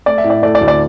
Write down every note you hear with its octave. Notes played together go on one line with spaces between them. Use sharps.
A3 D5
E5
A2
D5
A3 D5
D5
D2
D5